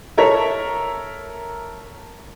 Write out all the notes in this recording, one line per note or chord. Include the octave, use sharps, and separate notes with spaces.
A4 A#4 C#5 E5